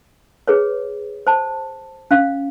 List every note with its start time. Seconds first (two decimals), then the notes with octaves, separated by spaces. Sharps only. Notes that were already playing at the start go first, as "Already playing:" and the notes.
0.48 G#4 B4 C#5
1.27 C5 A5
2.11 C#4 F5